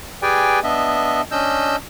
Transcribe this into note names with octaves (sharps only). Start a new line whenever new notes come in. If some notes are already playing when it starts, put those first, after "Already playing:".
G4 G#4 B4 D5 G5 G#5
B3 D4 D#5 E5
C#4 D4 D#5 E6 G6